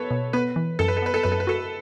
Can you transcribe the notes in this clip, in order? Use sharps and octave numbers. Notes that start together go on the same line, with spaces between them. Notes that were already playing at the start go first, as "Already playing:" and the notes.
Already playing: B3 A4 B4 C#5
B2
B3 B4
E3
F#2 A4
B4
A4
B3 B4
A4
F#2 B4
A4
B4
F#4 A4